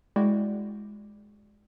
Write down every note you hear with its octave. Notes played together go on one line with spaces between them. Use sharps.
G#3 E4 F#4 D5 G5